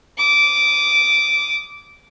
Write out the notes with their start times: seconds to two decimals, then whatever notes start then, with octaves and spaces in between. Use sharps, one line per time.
0.18 D6 D#6